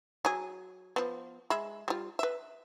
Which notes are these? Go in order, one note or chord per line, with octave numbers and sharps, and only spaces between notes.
F#3 G#4
F3 B3
G#3 E5 B5
G3 F4
B4 E5